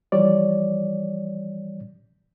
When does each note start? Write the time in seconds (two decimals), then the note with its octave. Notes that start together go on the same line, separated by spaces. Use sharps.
0.12 E3 F3 G3 C#5 D5